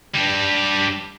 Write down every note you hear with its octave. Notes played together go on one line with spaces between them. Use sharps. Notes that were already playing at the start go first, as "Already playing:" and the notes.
G3 D4